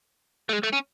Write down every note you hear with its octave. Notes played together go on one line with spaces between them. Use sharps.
A3
G#3
A3
C#4